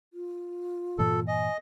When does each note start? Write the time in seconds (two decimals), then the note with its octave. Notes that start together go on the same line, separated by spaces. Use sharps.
0.14 F4
0.99 G2 A#2 E3 A4
1.27 D#5 G#5